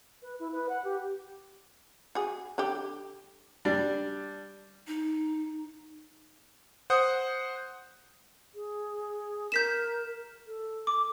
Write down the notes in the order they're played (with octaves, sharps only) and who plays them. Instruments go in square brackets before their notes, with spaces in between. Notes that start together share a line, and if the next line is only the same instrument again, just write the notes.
[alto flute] B4
E4
B4
F#5
G4
[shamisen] F#4 G#4
D3 G3 G4
[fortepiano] G3 D4
[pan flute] D#4
[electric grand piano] C5 F#5 D#6
[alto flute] G#4
[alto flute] A#4 [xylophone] G6 B6 E7
[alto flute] A4
[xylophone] D6